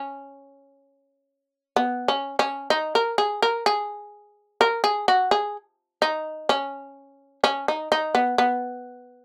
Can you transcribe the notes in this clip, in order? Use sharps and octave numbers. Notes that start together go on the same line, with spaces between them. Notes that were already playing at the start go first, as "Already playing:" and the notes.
Already playing: C#4
B3
C#4
C#4
D#4
A#4
G#4
A#4
G#4
A#4
G#4
F#4
G#4
D#4
C#4
C#4
D#4
D#4
B3
B3